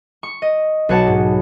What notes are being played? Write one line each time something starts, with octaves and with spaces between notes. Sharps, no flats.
C#6
D#5
B1 F#4 C#5 F#5 A5
G#2